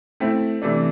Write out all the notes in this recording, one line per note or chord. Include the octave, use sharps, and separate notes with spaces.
A3 C4 E4
C3 E3 A3 D4